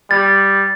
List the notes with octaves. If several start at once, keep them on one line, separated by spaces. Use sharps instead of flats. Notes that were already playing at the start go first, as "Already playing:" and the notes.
G3 A6